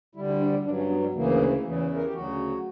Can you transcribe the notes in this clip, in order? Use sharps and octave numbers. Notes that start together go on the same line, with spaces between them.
D2 D3 G3 E4
E4
D4
D4
G2 F#3 D4
C#4
B3
G3
D2 C#3 E3 A#3
E2 C#3 E3
A#4
G4
D2 C#3 F#3 F#4